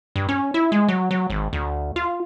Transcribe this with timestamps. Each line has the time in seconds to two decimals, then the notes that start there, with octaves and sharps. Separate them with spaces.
0.16 G2
0.29 C#4
0.54 E4
0.72 G#3
0.88 F#3
1.11 F#3
1.30 G#1
1.53 D2
1.96 F4